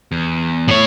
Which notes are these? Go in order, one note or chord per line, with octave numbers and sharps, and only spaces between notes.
E2
A2 C#5